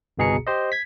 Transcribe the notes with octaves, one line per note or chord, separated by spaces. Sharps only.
G1 C2 B2 G#4 A#5 C#7
G4 C5 D#5
G#6 B6